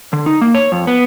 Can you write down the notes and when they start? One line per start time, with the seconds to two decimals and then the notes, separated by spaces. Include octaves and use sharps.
0.13 D3
0.26 D#4
0.41 A#3
0.54 C#5
0.72 F2
0.87 B3